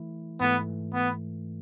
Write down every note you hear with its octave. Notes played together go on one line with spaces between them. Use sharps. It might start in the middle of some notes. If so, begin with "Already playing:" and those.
Already playing: E3 A3 E4
G#2 E3 A3 B3
B3